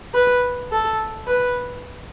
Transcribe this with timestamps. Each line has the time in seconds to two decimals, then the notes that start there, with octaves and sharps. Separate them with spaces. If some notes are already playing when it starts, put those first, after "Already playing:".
0.14 B4
0.71 A4
1.27 B4